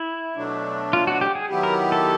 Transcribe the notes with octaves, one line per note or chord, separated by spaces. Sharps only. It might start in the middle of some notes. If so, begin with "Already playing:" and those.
Already playing: E4
B2 F#3 A3 D4
F4
F#4
G4
G#4
D#3 F#3 B3 E4 G4
A#4
A4